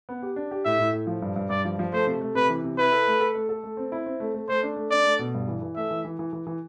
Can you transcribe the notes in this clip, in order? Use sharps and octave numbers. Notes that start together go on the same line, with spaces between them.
B3
G4
D4
G4
A2 E5
A2
A2
F3
G2
G2
G2 D5
F3
F3
A3 C5
C3
A3
C3 B4
E3
C3
E4 B4
A4
A3
A4
A3
A4
A3
C4
E4
C4
A3
A3
A3 C5
D4
A3
D4 D5
A3
B2
G2
E3
E3
A3 E5
E3
E3
E3
E3
E3